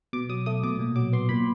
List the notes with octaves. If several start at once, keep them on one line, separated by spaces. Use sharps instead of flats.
B2 D6
F#3 D#6
A3 D#6
B2 D6
A#2
F#3 D6
B3 C6
A#2 B5